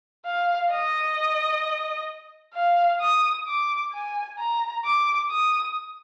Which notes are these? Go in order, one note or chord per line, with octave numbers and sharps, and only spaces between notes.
F5
D#5
F5
D#6
D6
G#5
A#5
D6
D#6